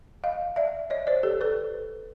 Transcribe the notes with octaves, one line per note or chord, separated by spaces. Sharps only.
D#5 F5
D5 E5
C#5 D#5
C5 D5
G4 A4
A4 B4